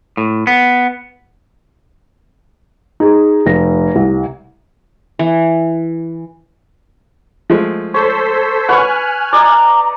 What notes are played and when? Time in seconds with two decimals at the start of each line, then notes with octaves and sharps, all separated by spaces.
0.17 A2
0.47 B3
3.00 D#4 G#4
3.46 F1 A#6
3.95 C2
5.19 E3
7.50 F3 G#3 A3
7.94 A4 C5 C#5 B6
8.69 B4 C#5 F#5 G#5 C#6 F6 F#6
9.33 D5 D#5 A#5